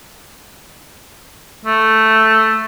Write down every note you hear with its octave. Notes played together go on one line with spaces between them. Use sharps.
A3